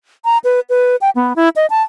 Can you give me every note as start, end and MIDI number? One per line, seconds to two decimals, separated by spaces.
0.25 0.38 82
0.44 0.60 71
0.69 0.96 71
1.01 1.10 79
1.15 1.33 59
1.36 1.49 64
1.56 1.66 75
1.70 1.82 81